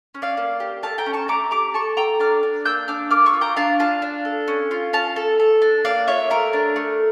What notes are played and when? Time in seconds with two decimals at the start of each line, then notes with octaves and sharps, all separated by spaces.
0.14 C#4
0.22 D5 F5
0.37 A#3
0.60 G4
0.83 A3 F5 A5
0.98 G5 A#5
1.06 C#4
1.13 A5 C#6
1.28 A3 A#5 D6
1.51 G4 A#5 D6
1.74 A4 A5 C#6
1.97 A4 G5 A#5
2.19 D4 D6 F6
2.43 D4
2.65 A#3 E6 G6
2.88 D4 D6 F6
3.11 A#3 D6 F6
3.26 C#6 E6
3.34 F4
3.41 G5 A#5
3.56 D4 F5 A5
3.79 F4 F5 A5
4.02 D4
4.25 A4
4.48 C#4
4.71 F4
4.93 C#4 F5 A5
5.16 A4
5.40 A4
5.62 D4
5.85 A#3 D5 F5
6.08 F4 C#5 E5
6.30 A3 A#4
6.53 D4
6.76 A3